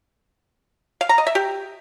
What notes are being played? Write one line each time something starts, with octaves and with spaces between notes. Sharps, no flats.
F5
A#5
D#5
E5
G4